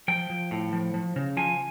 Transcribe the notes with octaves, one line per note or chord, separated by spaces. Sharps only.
F3 G5
F3
A2
F3
F3
C#3
F3 G#5